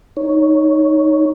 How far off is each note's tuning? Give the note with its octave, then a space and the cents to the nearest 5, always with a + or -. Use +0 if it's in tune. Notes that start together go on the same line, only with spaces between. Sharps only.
D#4 +0 C#5 +5